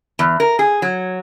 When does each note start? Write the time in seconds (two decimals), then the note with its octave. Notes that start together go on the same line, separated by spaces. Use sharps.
0.19 E2
0.40 A#4
0.59 G#4
0.82 F#3